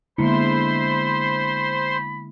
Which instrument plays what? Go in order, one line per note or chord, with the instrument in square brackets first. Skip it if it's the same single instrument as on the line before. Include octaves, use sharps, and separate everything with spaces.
[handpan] D3 G#3 E4 [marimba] A#3 B3 [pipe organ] C5 C6 [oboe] B5